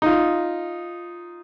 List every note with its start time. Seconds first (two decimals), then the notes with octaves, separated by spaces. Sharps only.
0.02 D#4 F4